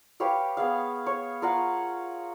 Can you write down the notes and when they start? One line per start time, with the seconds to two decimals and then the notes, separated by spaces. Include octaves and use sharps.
0.20 G4 B4 C#5 F5
0.57 B3 G#4 F5
1.06 C#5
1.42 F4 A#4 F5 F#5